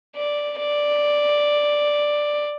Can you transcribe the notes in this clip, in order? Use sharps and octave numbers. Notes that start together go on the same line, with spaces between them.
D5
D5